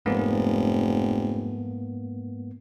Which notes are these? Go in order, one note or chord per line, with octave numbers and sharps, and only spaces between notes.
F1 G#2 A#3 B3